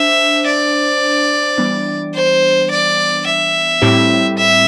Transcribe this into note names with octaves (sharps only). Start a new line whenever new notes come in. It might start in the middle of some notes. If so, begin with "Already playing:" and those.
Already playing: D4 C5 E5
D5
E3 G3 B3 D4
C5
D5
E5
A2 G3 C4 E4 G4
E5